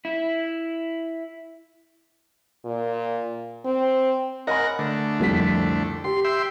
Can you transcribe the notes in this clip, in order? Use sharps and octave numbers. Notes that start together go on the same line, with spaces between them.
E4
A#2
C4
A#4 D#5 F#5 G#5 B5
D3 A3
C2 F2 B6
G4 C6
E5 G5 C6